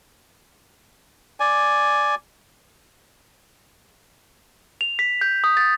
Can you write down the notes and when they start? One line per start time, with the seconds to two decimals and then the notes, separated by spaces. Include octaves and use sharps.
1.40 D5 G#5
4.81 F7
4.99 B6
5.21 G6
5.44 D#6
5.57 A6